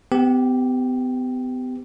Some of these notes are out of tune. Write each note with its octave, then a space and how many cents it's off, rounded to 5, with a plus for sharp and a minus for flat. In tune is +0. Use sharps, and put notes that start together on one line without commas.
B3 +40 G4 +0